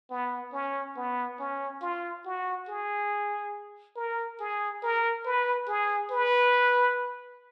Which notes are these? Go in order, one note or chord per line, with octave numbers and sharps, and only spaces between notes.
B3
C#4
B3
C#4
F4
F#4
G#4
A#4
G#4
A#4
B4
G#4
B4